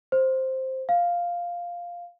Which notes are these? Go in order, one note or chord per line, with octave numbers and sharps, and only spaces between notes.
C5
F5